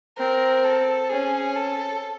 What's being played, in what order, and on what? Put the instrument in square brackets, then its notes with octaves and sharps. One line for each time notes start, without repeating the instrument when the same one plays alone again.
[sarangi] C4 [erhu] A#4
[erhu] A4
[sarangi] C#4 [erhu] G#4
[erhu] A4